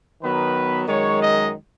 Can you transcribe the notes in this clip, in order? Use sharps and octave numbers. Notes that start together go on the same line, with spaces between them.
D#3 F#3 B3 B4
F#2 D#3 G#3 C#5
D#5